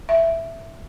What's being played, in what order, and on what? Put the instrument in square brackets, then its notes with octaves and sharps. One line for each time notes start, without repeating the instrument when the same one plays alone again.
[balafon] E5